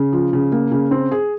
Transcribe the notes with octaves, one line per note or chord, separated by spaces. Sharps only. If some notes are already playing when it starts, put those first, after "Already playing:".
Already playing: C#3
F3
C#3
A#3
C#3
C4
G#4